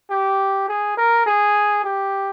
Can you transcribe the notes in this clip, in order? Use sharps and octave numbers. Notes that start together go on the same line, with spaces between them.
G4
G#4
A#4
G#4
G4